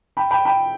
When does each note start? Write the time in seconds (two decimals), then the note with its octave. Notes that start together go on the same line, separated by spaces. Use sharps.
0.17 G5 B5
0.31 G5 B5
0.45 G5 B5